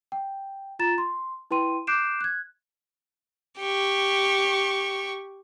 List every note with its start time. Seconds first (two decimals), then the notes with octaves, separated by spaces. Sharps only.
0.12 G5
0.79 F4 A#5 A6 E7
0.98 C6
1.51 E4 B4 G5 C6 D#7
1.87 D6 F#6 G6 C7 D7 E7
2.21 F#6 G#6
3.60 G4 C#6